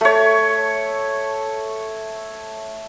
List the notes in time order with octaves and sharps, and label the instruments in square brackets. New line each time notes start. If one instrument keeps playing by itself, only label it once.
[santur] A3 C#5